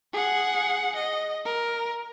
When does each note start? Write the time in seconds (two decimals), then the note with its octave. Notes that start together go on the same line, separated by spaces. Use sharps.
0.13 G#4 F#5
0.96 D#5
1.45 A#4